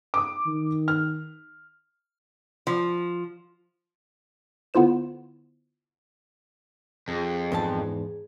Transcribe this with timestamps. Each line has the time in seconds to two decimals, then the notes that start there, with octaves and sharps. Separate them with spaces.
0.14 D6 D#6
0.46 D#3
0.88 F6
2.67 F3
4.74 D3 B3 E4 F4 C5 E7
7.08 F2 G#4
7.52 E2 G#2 A5